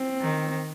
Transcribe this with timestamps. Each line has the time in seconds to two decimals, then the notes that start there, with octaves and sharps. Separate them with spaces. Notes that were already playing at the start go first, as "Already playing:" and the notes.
Already playing: C4
0.21 D#3